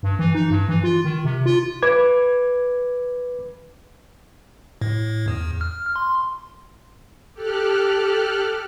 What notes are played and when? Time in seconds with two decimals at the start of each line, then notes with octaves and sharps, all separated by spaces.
0.03 G2
0.19 E3
0.35 D#4
0.51 G2
0.69 E3
0.84 F4
1.05 D#3
1.25 C3
1.46 F4
1.83 B4 D6 G#6
4.82 A2
5.28 E2
5.61 F6
5.96 C6
7.34 G4 A4 F6 F#6